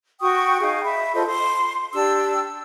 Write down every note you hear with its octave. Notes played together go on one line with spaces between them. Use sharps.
F#4 G5 C#6 D#6
D#4 G#4 F5 G5
E5 B5
F4 A4 C5 D#5
C6
D4 G4 E6